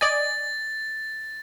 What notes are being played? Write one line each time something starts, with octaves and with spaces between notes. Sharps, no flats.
D5 D#5 G#5 A6